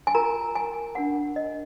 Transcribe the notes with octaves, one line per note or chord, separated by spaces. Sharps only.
G#5
F4 A#4 A#5
G#5
D4 F4 A#4 F#5
D#5